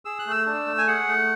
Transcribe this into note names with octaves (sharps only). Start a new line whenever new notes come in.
G#4 E6
F#6
A3 E6
D4
A3
G#5
G#4 F#5
A3